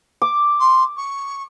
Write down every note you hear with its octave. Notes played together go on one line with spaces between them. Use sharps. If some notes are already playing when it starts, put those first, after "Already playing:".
D6
C6
C#6